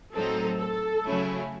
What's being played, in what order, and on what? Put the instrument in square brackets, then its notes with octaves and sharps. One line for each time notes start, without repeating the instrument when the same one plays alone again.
[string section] A2 F#3 C4 D#4 [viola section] A4
[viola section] A4
[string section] C#3 F#3 A3 C#4 E4